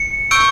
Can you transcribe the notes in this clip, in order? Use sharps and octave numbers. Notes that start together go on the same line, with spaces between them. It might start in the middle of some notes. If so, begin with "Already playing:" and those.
Already playing: C#7
C#6 E6 G6 D7